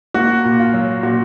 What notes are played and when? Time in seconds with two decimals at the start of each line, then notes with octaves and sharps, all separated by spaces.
0.14 A#3 F#4
0.44 A#2
0.59 F4
0.74 F#3
1.03 A#2 F#4